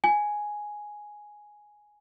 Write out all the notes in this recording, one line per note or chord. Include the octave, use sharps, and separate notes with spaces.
G#5